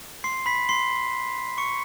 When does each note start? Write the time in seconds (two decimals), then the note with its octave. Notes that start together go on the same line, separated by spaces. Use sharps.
0.24 C6 C7
0.46 B5 B6
0.69 C6 C7
1.58 C#6 C#7